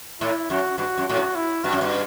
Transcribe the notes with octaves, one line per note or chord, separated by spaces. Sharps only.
A2 E4
F#2 F#4
G2 F#4
F#2
A2 F#4
G2
E4
G2 F#4
F#2
G2